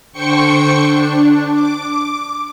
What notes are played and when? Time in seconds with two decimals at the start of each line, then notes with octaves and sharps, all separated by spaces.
0.13 D3 C5 G5 C#6 C#7
0.89 D4
1.52 D6